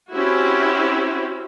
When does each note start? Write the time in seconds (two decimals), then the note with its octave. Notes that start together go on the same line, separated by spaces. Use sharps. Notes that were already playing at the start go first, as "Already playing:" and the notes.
0.13 C4 C#4 E4 F#4 G4